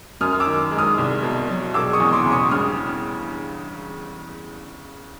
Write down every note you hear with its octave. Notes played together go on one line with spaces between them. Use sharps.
F#2 D#6 F6
F6
D6 E6
D#3
G#3
D#6 F6
C2
B2
F#3
E1 D6 E6
C#6 D#6
E2
C6 D6
C#3
C#6 D#6
G2 D#6 F6